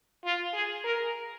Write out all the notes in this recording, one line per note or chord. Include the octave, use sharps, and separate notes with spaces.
F4
G#4
A#4